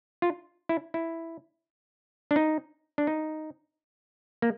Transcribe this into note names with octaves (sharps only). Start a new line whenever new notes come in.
F4
E4
E4
D4
D#4
D4
D#4
A#3